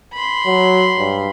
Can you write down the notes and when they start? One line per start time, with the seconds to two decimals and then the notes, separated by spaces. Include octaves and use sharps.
0.14 B5 C6
0.46 F#3
0.99 G2